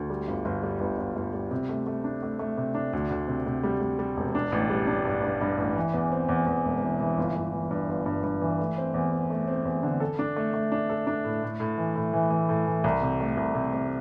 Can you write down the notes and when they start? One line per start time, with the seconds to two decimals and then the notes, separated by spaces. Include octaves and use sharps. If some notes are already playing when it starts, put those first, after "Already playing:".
Already playing: D2
0.10 G3
0.28 G1
0.45 G1
0.63 G3
0.80 G1
0.98 G1
1.16 G1
1.33 G3
1.51 C3
1.69 A3
1.87 A3
2.04 D4
2.23 A3
2.39 A3
2.57 C3
2.75 D4
2.93 D2
3.11 D2
3.28 C3
3.46 C3
3.63 G3
3.81 G3
3.99 G3
4.17 E1
4.35 D4
4.52 A1
4.70 G3
4.87 D4
5.05 G2
5.23 G2
5.41 G2
5.58 A1
5.76 E3
5.94 E2
6.12 C4
6.29 E2
6.47 E2
6.65 E1
6.82 E3
7.00 E3
7.18 G1
7.35 G1
7.53 E3
7.71 G2
7.89 G1
8.06 G2
8.24 G2
8.41 E3
8.59 A3
8.78 C4
8.94 E2
9.13 C4
9.30 A3
9.47 C4
9.65 E2
9.83 D3
10.00 A4
10.19 D4
10.36 A3
10.54 A3
10.72 D4
10.90 A4
11.07 D4
11.25 A2
11.43 A2
11.60 A2
11.78 E3
11.96 A2
12.13 E3
12.30 E3
12.49 A2
12.66 E3
12.84 C2
13.02 C3
13.20 A3
13.37 C2
13.55 C3
13.73 C3